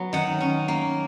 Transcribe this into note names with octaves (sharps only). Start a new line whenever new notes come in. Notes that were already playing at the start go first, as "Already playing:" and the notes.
Already playing: F#3 B3
D#3 F#5
C#4
A#3